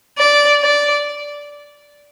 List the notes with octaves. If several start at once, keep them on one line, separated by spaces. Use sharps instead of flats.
D5
D5